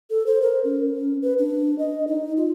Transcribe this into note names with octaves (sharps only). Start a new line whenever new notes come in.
A4
C5
A#4
C#4
B4
D4
D#5
D#4
F4